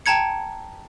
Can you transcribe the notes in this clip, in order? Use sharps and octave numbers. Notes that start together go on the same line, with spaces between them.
G5 A5 A#5 G#6 C#7